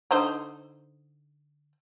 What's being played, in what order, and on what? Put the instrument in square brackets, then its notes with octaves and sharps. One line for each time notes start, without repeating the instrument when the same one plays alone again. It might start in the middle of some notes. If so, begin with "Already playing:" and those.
[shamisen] D3 D#4 C5